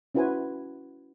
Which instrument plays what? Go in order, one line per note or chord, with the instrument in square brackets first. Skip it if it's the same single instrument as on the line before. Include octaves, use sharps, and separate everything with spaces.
[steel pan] C#4 E4 F#4 B4 C5 G#5